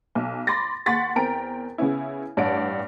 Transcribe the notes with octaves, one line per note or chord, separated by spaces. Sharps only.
B1
B5 C6 D6 A6 A#6
D#2 F#5 C6 C#6 A6 B6
E2 C4 A#4 G5 A#5 D7
C#3 B3 C#4 E4
A1 G2 C#5 D5 F#5 D7